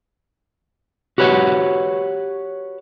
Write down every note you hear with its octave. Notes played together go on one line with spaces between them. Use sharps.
F#4 G4 B4 C#5 F#5